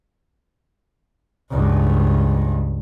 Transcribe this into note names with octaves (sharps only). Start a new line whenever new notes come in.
C#2 G2